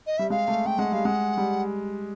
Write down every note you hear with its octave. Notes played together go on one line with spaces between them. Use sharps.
D#5
G3 E5
G#3 F5
A3
A3 G5
G#3 F#5
G3 F5
G#3 F#5
G3